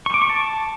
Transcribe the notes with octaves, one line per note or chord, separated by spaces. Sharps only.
C#6
D6
C#6
A5